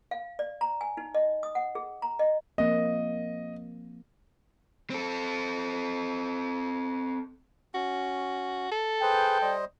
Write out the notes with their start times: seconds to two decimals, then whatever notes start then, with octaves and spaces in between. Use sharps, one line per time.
0.11 F5
0.39 D5
0.61 A#5
0.81 G#5
0.97 D#4
1.15 D#5
1.43 D#6
1.55 F#5
1.75 G#4
2.02 A#5
2.19 D#5
2.58 F3 A#3 C4 D#5
4.90 C4 A4
7.75 C#4 F#4
8.72 A4
9.02 G#4 B4 C5 G5
9.42 G3 C5 D#5